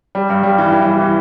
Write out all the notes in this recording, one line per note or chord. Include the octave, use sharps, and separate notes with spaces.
G3
G2
G3
E3
E3
G3
E3